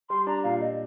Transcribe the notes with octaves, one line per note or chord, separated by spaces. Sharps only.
G3 C6
D4 A#5
A#2 F5
A#2 D#5